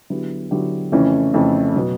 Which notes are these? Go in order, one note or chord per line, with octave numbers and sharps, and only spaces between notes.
D3 F#3 B3 E4 G4
D3 F#3 B3 E4 G4
F2 C#3 E3 A3 C#4
F2 C#3 E3 A3 C#4
B2 F#3 B3